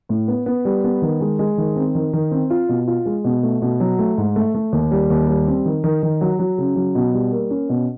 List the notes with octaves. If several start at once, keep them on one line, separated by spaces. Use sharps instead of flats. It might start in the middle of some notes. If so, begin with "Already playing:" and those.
A2
B3
B3
G3
B3
D#3
G#3
G#3
D#3
C4
D#3
D#3
C4
F4
B2
F4
G#3
B2
A3
B2
F#3
A3
G#2
A3
A3
D#2
G3
D#2
G3
C4
D#3
D#3
D#3
F#3
F#3
C#3
F#3
B2
G3
A#3
C#4
B2